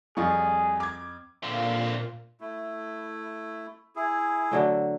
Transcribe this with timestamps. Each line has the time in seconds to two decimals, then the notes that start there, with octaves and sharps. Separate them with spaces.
0.17 F2 G3 F4 G#4 C#6
0.80 D6 G#6
1.43 A#2 D3 C4 F4
2.41 A3 E4
3.96 E4 G#4
4.51 D3 F#3 A3